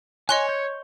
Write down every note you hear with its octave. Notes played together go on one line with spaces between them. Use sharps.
C#5 D#5 G#5 C6 F#6
G6